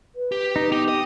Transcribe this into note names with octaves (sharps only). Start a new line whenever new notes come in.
B4
G4
D#4
B3 D#4 G4
D#5